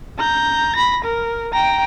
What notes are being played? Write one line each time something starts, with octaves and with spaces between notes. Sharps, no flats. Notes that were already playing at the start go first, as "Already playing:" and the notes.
A#5 G6
B5 A#6
A#4
G5 A#5